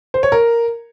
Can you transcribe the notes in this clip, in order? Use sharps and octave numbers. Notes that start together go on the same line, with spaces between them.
C5
C#5
A#4